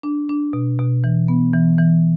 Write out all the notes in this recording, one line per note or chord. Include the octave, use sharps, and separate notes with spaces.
D4
D4
B2
B2
E3
B3
E3
E3